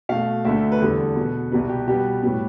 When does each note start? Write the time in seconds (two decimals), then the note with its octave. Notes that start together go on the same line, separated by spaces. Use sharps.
0.09 B2 A3 F5
0.44 D2 D3 A3 E5
0.72 B4
0.80 E2 D3 G3 A4
1.16 B2 B3
1.52 C2 B2 G3 B3 B4
1.69 G4
1.87 B2 G3 B3 G4
2.23 A2 G3 B3